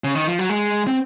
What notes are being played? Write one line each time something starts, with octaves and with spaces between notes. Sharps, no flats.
C#3
D#3
F3
F#3
G#3
C4